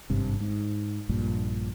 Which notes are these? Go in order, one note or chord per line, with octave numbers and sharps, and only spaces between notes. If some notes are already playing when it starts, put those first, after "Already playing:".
G#1 G2 C3
G#2
A#1 G2 A#2